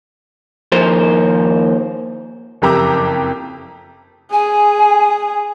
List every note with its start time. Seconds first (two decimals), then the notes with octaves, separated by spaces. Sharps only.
0.72 D#2 F3 A#4 C5 C6
2.62 F#1 F2 G4 A#5 D6 E6
4.33 G#4 G#5